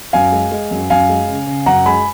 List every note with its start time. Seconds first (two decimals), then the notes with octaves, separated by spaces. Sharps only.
0.13 F#2 F5 G#5
0.32 G#3
0.52 G#3
0.71 F#2
0.90 F#2 F5 G#5
1.09 G#3
1.28 C#3
1.47 C#3
1.66 F#2 F#5 A#5
1.85 G#3 G#5 B5